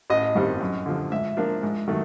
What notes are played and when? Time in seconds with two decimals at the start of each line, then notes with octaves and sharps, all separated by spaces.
0.10 A1 D#5
0.35 G2 D#3 G3 C4
0.60 F#2
0.86 D3 F3
1.12 G#2 E5
1.37 F3 A#3 D4
1.63 G#2
1.88 D#3 F#3 A3